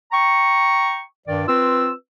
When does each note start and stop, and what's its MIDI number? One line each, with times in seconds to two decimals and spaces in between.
0.12 1.03 79
0.12 1.03 82
0.12 1.03 85
1.28 1.44 43
1.28 1.44 51
1.28 1.44 74
1.48 1.92 60
1.48 1.92 65
1.48 1.92 71
1.48 1.92 88